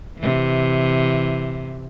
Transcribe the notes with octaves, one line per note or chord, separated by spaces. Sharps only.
C3 E3